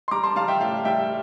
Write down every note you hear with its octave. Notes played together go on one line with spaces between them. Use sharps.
C6
G3 A#5 D6
A5 C6
G3 F5 A5
E5 G5
A2 F5
G3 E5 G5